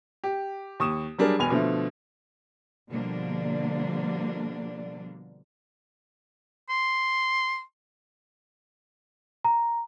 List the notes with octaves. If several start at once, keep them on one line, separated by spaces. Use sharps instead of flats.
G4
D#2 C#6 D#6 E7
F#3 G3 D4 G#4 A#4
E1 B2 G#5 F7
B2 D3 F3 A3
B2 D3 F3 G3 A#3 D4
C6
A#5